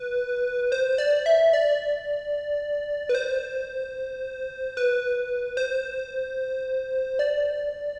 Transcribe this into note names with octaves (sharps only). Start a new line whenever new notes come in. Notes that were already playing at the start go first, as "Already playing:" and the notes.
Already playing: B4
C5
D5
E5
D5
B4
C5
B4
C5
D5